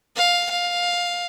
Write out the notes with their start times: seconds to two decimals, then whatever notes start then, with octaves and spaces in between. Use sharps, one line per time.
0.16 F5
0.51 F5